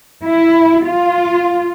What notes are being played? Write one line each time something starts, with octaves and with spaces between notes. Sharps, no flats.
E4
F4